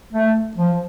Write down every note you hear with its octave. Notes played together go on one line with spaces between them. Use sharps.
A3
F3